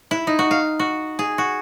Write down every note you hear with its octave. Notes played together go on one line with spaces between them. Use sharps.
E4
D#4
F#4
F5
F#4
G#4
F#4